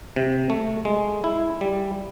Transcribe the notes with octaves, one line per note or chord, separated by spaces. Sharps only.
C3
A3
G#3
E4
G3